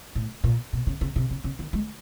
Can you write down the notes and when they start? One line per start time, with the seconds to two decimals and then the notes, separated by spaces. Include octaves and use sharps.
0.15 A2
0.44 A#2
0.73 B2
0.87 C#3
1.01 C#3
1.16 C3
1.31 C#3
1.44 C#3
1.59 D#3
1.73 G#3